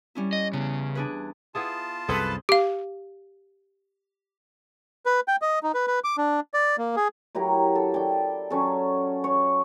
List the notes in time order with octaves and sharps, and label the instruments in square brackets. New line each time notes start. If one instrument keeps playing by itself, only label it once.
[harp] G3 C#4 E4
[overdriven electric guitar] D#5
[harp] E2 [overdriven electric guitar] C#3
[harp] D4 G#4 B4
[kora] B3 E4 G#4 [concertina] F4 A5
[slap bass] C2 F#2 [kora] C4 G#4 [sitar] A4 B4
[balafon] G4 F5
[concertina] B4
G5
D#5
D#4
B4
B4
D6
D4
D5
A#3
G#4
[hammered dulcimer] F#3 E4 G4 A#4
A4
D5 G5
F#3 C#4 A4
C#5